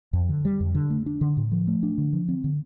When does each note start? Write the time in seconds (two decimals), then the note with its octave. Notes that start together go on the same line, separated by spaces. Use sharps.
0.13 F2
0.29 D3
0.45 G3
0.60 F2
0.75 D3
0.90 A3
1.06 D4
1.21 D3
1.37 A2
1.52 F3
1.67 A3
1.83 D4
1.98 D3
2.13 F3
2.29 C4
2.44 D3